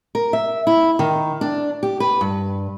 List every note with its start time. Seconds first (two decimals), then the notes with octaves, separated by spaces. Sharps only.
0.15 A#4
0.33 E5
0.67 E4
0.99 D#3
1.41 D4
1.83 G4
2.00 B4
2.21 G2